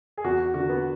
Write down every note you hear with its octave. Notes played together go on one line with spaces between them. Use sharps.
G#4
E2 F#4
F#4
D3 F#4
B3